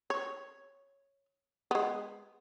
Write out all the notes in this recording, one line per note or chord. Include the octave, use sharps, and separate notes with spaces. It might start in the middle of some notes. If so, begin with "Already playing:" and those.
C#5
G#3 B3